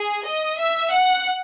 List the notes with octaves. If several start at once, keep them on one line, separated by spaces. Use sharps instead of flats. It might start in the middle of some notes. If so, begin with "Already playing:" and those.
Already playing: G#4
D#5
E5
F#5